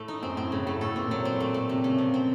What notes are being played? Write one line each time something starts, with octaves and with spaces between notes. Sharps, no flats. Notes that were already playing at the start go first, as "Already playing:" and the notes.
Already playing: A2 A3
D#4
F#2 C4
A2 C4
A2 C#3
A2 A3
A2 A4
A#2 C4
A2 F#3
C4
A#2 A3
A3
C3 A3
C#3 A3
F3
C4